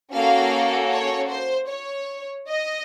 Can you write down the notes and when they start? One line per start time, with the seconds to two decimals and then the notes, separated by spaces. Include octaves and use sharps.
0.13 A#3 C#4 F#4 A4 F5
0.93 C#5
1.31 C5
1.70 C#5
2.49 D#5